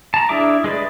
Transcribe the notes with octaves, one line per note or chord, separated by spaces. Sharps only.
A5 A#5
D4 E4 G#4 E5 D6
G#3 G#4 B4 D5